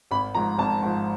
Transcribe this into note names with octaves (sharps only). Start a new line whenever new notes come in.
G#1 B5
G#2 F3 A#5
G#1 A5
G#2 F3